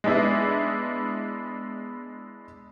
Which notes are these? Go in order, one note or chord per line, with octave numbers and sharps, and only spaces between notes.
G#3 B3 D4 E4 G#4